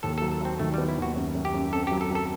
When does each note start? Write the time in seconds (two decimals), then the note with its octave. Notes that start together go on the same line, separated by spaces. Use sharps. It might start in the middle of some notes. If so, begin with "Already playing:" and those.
0.03 D#2 A4
0.18 F#3 A4
0.31 A4
0.41 F#3 C4
0.59 D#3 A3
0.74 G3 B3
0.89 E4
0.98 D#2 F#4
1.16 F#2
1.35 F#2
1.45 G4
1.54 F#2
1.73 C4 A4
1.87 F#3 G4
2.01 A4
2.10 F#3
2.15 A4